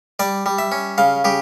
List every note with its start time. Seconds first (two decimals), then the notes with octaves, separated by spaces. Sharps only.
0.19 G3 D5
0.46 G3
0.58 E5
0.72 C#4
0.98 C#3 F5
1.24 C#3 G4